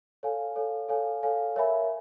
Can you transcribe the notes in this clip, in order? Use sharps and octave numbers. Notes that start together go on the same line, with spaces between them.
A4 C#5 F5 G#5
A4 C#5 F5 G#5
A4 C#5 F5 G#5
A4 C#5 F5 G#5
A#4 C#5 E5 G#5 B5